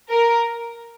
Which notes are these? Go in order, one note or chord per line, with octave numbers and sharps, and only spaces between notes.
A#4